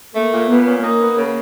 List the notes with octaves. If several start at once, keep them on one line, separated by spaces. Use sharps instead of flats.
A3 A#3
A#2
A#2 B3
C#4
A#3 D#4
B3
C#3